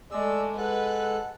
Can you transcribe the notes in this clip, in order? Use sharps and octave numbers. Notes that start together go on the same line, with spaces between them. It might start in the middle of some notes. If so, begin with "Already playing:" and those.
G#3 A3 D5 E6
G#3 A4 B4 F#5 F#6